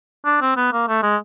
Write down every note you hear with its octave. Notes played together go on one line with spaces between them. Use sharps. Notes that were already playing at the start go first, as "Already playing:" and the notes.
D4
C4
B3
A#3
A3
G#3